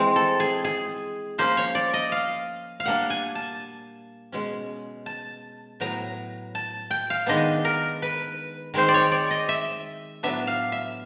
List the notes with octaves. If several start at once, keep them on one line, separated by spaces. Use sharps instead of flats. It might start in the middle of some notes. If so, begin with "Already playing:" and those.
Already playing: E3 G#3 C4
A4
G#4
G#4
F3 A#3 C#4 C5
C#5
D5
D#5
F5
F5
A#2 G3 A#3 D4 F#5
G#5
A5
B2 G#3 C#4
A5
A2 F#3 B3 A#5
A5
G5
F5
D#3 G#3 B3 D4 D#5
A#4
B4
D#3 G#3 C4 C5
D5
C#5
D5
D#5
E5
A2 F#3 B3 D4 E5
F5
E5